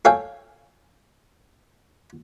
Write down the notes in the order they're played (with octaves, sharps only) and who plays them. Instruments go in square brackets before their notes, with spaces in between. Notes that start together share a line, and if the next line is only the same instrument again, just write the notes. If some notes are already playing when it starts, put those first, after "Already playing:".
[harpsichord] A4 C#5 F5 G5 G#5